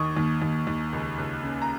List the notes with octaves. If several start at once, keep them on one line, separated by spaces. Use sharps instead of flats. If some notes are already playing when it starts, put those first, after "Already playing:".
Already playing: D#2 D#3 A#3 C#6 D#6
D#2
D#2
D#2
C#2
C#2
C#3
A#5